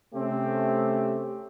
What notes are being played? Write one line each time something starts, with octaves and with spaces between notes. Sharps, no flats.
C3 A3 C4 C#4 G4